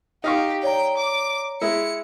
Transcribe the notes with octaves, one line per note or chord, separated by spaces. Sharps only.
D#4 G4 F5 C#6
C#5 D5 G5 A#5
D6
G#3 E4 C#7